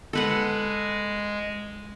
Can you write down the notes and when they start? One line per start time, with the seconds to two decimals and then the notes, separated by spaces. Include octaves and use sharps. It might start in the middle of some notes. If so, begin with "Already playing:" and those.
0.13 G#3 A4 B4 F#5